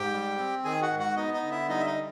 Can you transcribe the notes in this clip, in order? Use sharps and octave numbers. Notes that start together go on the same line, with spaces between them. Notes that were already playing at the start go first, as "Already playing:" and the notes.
Already playing: G#2 G4 G5
G3
C4
D#3 G#4 G#5
F#4 F#5
G#2
F#4 F#5
B3 D#4 D#5
D#4 D#5
D3
E4 E5
G3 D#4 D#5
E5
D#4 D#5
D3